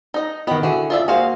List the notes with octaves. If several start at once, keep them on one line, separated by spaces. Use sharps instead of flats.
D#4 D#5
D#3 B3 G4 B4 D#5
D3 E4 F#4 G#4
F4 D5 E5
A#3 F#4 G#4 C5 F5